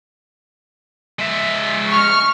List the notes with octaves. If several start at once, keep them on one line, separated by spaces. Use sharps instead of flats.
G#3 E5
C#6 F6